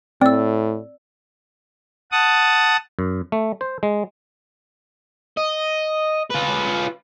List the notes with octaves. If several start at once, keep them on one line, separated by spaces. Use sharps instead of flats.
A2 C4 D5 E6
F#5 A5 D#6
F#2
A3
C5
G#3
D#5
F4 B4